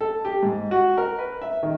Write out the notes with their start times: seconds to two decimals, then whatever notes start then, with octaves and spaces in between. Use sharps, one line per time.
0.01 A4
0.25 G4
0.43 G#2
0.71 F#4
0.98 A#4
1.19 B4
1.42 E5
1.63 D#3